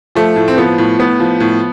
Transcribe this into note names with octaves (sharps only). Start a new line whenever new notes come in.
F3 A3
A2
C4
F3 B3
A2
A2 B3
F3
A2